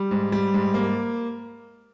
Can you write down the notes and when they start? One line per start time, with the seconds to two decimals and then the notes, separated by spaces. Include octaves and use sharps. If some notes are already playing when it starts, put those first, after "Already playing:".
Already playing: G3
0.11 G#2
0.32 G3
0.54 G#2
0.74 A#3